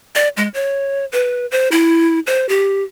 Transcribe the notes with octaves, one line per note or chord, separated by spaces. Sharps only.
D5
G#3
C#5
B4
C5
E4
C5
G4